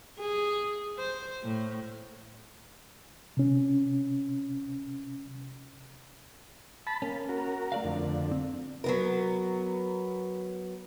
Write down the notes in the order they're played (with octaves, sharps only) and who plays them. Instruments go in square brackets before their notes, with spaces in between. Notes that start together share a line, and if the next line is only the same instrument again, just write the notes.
[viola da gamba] G#4
C5
A2
[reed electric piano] C3 C#4
[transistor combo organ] A5 B5
[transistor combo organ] A#3 [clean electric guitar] C#4
[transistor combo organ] F#4 A#4
[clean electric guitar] A3 D5 F5
[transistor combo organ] F2 D3
[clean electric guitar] C4
[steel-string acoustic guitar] F#3 B3 A#4